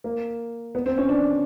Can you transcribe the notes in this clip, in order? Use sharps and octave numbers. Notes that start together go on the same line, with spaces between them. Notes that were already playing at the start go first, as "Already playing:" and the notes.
A#3
B3
C4
C#4
D4